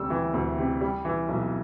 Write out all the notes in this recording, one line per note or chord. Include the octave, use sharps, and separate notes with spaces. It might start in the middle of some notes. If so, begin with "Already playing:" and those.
Already playing: D2 C3 G3 E6
E3
D2
C3
G3
E3
B1